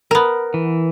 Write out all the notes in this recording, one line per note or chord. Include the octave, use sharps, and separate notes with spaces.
B3 A#4
E3